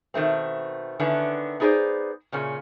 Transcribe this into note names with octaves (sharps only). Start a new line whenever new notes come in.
B2 D#3 F#3 A3 C4
D3 D#3 B3 C#4 D4 E4
B3 D#4 G#4 A4 C5 D5
A#2 C#3 C#4